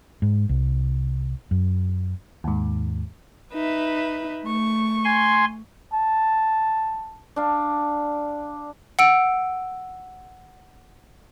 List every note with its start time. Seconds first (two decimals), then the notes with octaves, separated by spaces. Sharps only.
0.22 G#2
0.49 C2
1.51 F#2
2.44 D#2 G#2
3.53 D#4 B4 E5
4.43 A3 C#6
5.05 G#5 C6
5.93 A5
7.36 D4 F5
8.99 F#5 E6 D7